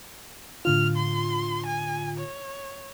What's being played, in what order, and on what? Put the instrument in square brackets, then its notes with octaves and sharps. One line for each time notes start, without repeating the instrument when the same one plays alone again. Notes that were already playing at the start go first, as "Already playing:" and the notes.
[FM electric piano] A2 D3 F4 [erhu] F6
[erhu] C6
G#5
C#5